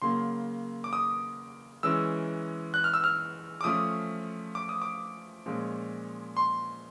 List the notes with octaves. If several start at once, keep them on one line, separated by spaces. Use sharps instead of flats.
C#3 F#3 A#3 C6
D6
D#6
E3 G#3 C#4 E6
F#6
F6
E6
F6
D6
F3 A3 C#4 D#6
D6
D#6
D6
A#2 F3 G#3 C#4
C6